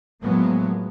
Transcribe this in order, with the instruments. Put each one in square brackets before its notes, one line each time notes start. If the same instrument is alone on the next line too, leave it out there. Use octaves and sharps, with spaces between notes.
[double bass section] A2 F3 F#3 G#3 A#3 B3